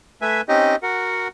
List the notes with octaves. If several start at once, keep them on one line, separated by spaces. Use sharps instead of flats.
A3 B4 E5 G#5
C4 C#4 D#4 G4 D#5
F#4 A#4 F#5